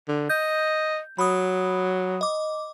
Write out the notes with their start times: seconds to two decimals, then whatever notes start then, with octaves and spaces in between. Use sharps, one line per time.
0.08 D3
0.29 D#5 G6
1.18 F#3 B5 D#6
2.21 D#5 D6